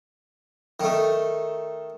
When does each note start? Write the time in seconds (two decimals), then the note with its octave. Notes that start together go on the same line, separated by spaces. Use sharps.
0.80 D#3 A3